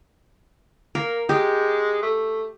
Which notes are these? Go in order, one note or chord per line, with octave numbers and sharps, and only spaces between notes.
A#3 A#4
G#3 G4
A3